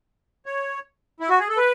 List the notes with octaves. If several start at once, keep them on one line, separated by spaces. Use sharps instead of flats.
C#5
E4
F#4
G#4
A4
B4